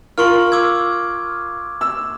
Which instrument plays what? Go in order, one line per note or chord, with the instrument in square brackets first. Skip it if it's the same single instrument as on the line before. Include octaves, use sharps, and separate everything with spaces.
[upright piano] F4 A#4 [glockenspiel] C6 C#6 F6
[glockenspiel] D6 E6 G#6
[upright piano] E6